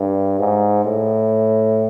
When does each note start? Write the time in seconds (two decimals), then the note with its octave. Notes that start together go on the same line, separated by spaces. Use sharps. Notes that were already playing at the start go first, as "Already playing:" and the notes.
Already playing: G2
0.39 G#2
0.85 A2